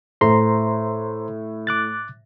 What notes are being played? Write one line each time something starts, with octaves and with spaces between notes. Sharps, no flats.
A2 C5 A#5 C6
D6 F#6 A6